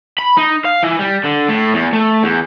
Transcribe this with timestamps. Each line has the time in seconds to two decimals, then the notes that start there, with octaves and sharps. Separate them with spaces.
0.18 B5
0.38 D#4
0.65 F5
0.83 E3
0.99 G3
1.24 D3
1.48 A2
1.74 E2
1.93 A3
2.23 E2